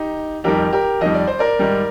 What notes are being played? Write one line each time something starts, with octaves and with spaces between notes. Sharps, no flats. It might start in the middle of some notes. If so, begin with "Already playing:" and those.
Already playing: D#4 G4
F2 D#3 G3 G4 A#4
G4 A#4
F2 D#3 G3 D#5
D5
C5
A#4 D5
G#2 D#3 G3